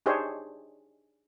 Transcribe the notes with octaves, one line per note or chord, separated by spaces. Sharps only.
D4 D#4 G4 G#4 C5 C#5